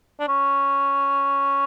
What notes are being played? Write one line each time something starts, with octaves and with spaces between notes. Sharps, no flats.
D4
C#4